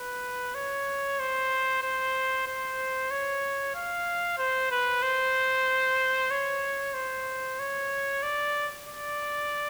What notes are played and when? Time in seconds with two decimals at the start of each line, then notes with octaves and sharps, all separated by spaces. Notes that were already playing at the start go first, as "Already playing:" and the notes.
Already playing: B4
0.55 C#5
1.20 C5
1.83 C5
2.47 C5
3.11 C#5
3.75 F5
4.38 C5
4.71 B4
5.02 C5
6.31 C#5
6.94 C5
7.59 C#5
8.23 D5
8.86 D5